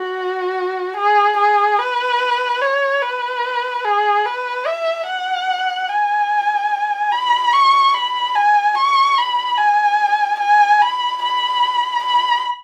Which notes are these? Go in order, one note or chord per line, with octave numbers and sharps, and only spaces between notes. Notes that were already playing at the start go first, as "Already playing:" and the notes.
Already playing: F#4
G#4
G#4
B4
C#5
B4
G#4
B4
E5
F#5
G#5
B5
C#6
B5
G#5
C#6
B5
G#5
G#5
B5
B5
B5